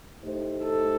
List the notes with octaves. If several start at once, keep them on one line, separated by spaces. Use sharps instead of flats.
A2 A3 D#4 G4 C5
A4